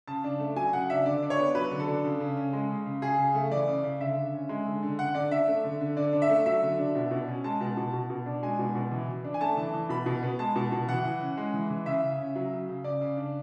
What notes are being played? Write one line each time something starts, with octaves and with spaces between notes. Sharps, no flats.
C#3 A5
D4
A3
F#3 G#5
C#3 F#5
D4 E5
D3 D5
D4
C#5
B3
F#3 B4
D3
A4
D4
C#3
C#3
C#4
G#3
C#3
C#3
C#3 G#4
C#3
A3
E3 D5
C#3
C#3
D3 E5
D3
C#4
G#3
D3
D3
D3 F#5
D3 D5
D4 E5
A3
D3
D3
D3 D5
D4
E5
A3
F#3 E5
D3
D4
B2
B2
C#4
G#3 A5
B2
B2
B2
B2
D4
G#3 G#5
B2
B2
E3
E3
D4
G#5
A3 A5
E3
E3
B2 B5
B2
B3
G#3 A5
B2
B2
E3 F#5
E3
C#4
G#3
E3
E3
C#3 E5
C#3
C#4
F#3
C#3
C#3
C#3 D5
C#3
D4